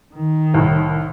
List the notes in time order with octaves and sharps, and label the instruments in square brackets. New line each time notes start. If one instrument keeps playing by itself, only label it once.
[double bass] D#3
[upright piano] C2 A2